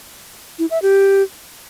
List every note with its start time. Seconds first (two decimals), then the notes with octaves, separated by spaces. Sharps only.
0.59 E4
0.71 E5
0.82 G4